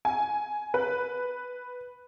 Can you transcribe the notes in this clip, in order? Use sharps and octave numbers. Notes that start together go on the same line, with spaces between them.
G#5
B4